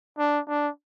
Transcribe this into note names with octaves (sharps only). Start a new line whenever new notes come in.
D4
D4